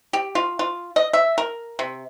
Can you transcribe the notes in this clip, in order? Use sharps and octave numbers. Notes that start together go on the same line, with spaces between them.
G4
F4
F4
D#5
E5
A#4
C3